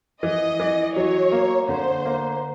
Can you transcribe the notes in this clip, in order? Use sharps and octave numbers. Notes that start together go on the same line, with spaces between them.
E3 D#5
E3
F#3 C#5
A#3
D3 C5
A#3